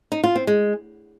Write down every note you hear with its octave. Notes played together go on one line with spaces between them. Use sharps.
D#4
F4
C4
G#3